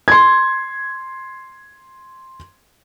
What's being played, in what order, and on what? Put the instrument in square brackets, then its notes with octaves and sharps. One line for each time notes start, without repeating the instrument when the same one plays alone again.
[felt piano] C6 G#6